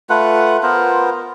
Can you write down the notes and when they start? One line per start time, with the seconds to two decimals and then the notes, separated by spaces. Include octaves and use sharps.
0.10 A3 F4 B4 F#5
0.63 B3 F4 A#4 C5